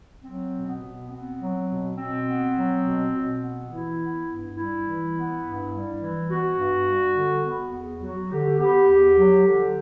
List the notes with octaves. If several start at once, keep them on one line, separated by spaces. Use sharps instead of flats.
F#3 C4
B2
B3
B2
B3 C4
F#3
B2
B2 C4
B3
F#3
B2
B2
B3
E3 E4
B3
G2
G3 E4
E3
B3
G2
G3
E3
B3 F#4
G2
G3
D3
B3
E2
F#3 F#4
D3 G4
B3 G4
E2
F#3
D3